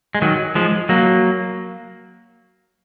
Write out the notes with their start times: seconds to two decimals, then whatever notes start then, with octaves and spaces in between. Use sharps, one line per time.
0.15 G#3
0.22 D#3 F#3
0.55 F3 G#3
0.89 F#3 A#3